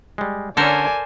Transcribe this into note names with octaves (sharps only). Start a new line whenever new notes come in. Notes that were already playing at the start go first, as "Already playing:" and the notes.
G3 G#3
D3 C#4 A4 A#4 C5 D5 G#5